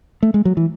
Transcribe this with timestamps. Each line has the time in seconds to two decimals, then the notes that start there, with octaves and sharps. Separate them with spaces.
0.23 A3
0.34 G#3
0.45 F#3
0.57 E3